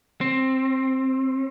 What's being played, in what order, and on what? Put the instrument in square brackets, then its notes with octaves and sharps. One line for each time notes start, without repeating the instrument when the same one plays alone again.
[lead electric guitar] C4